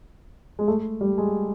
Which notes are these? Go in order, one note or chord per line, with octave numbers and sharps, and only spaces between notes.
G#3
A3
G3
G#3